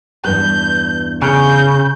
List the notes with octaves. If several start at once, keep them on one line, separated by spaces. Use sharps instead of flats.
E2 G2 B4 G6
C#3 G6